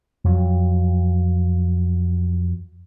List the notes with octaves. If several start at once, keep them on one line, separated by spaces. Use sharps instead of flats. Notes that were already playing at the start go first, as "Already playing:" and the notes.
F2 F#3